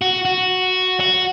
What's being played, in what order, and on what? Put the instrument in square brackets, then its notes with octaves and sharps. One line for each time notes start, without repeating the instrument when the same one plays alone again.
[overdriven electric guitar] F#4
F#4
F#4